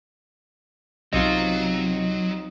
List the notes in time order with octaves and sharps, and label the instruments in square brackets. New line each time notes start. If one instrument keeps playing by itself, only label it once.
[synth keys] B1 D#5 [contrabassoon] C3 [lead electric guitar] F#3 [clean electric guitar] C4 D#4 F4